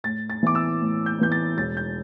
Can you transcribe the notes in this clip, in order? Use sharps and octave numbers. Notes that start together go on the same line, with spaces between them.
A2 A6
A6
E3 B3 E4 D6
E6
A2
G6
E3 B3 E4 G6
A6
E1 A6
G6